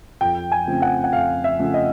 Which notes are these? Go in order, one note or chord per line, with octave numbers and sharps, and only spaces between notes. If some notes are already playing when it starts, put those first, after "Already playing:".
F2 G5
G#5
C#3 F3 A3 C4
F#5
F#5
F2 F5
E5
C#3 F3 A3 C4
D#5